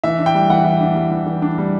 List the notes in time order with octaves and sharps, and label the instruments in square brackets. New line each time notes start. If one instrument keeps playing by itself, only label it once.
[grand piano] E3 E5
D4
G5
G3
E3 F#5
E3
D4
G3
E3
E3
D4
G3